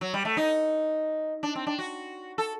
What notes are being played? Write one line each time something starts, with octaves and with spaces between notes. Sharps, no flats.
F#3
G3
A3
D#4
D4
C4
D4
F#4
A4